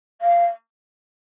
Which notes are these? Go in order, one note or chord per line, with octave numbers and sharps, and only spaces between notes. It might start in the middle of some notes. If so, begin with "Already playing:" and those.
F5